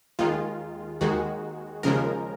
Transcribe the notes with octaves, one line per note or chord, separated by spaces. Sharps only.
D#2 D#3 G#3 F4
D#2 D#3 G#3 F#4
D#2 C#3 F3 G#3 A#4